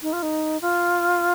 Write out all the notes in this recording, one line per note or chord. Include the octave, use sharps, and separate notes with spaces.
D#4
F4
D#4
F4